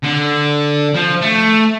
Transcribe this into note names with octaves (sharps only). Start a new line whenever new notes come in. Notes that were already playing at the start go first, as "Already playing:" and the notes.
D3
F3
A3